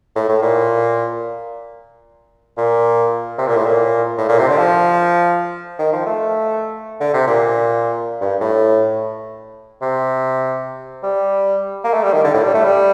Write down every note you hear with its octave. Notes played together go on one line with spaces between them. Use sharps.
A2
A2
A#2
A#2
C3
A#2
A2
A#2
A2
A#2
C3
D3
F3
D#3
F3
A3
D3
C3
A#2
G2
A2
C3
G3
A#3
A3
G3
D#3
D3
A2
G3
A3
G3